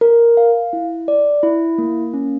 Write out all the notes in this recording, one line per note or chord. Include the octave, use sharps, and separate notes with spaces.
A#4
F5
E4
D5
E4
A#3
C#4